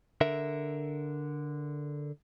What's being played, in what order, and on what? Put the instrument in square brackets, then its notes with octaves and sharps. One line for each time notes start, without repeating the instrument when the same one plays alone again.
[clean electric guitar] D3 A#4 E5